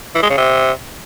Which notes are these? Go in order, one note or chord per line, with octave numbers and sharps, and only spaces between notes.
E3
G#3
C#3
C3